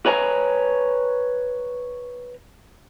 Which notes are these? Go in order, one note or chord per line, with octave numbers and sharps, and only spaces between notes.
B4 C#5 G#5 A#5